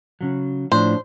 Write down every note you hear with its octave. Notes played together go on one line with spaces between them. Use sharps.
C#3 F#3
A2 F3 D4 C5